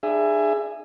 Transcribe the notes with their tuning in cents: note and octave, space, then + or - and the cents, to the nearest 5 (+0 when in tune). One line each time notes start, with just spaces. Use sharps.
D4 +40 G#4 +0 E5 +25